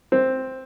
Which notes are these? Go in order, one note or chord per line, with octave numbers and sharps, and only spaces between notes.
C4